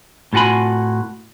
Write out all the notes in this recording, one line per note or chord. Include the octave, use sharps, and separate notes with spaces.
A2 F4 F#4 G#5 B5